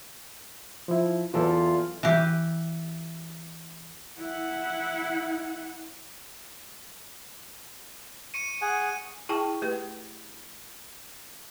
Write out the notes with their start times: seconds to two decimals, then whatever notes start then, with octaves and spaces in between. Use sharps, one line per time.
0.88 F3 E4
1.34 E2 E3 F#3 F4 A4
2.03 E3 G4
4.19 E4 F#5
8.34 C#6 C#7 D#7
8.61 G#4 F#5 G#5
9.29 E4 G#4 G5 A5 C#6
9.62 A3 G4 B4